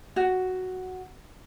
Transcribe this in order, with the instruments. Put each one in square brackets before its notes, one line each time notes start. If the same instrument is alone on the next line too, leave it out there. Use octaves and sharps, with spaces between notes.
[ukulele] F#4